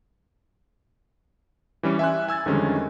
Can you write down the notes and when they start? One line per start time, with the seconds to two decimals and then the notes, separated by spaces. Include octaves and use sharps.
1.83 E3 G3 C#4
1.99 E5 G#5 C6 F#6
2.28 G#5 E6 G#6 A6
2.46 F2 D3 D#3 G3 G#3 C#4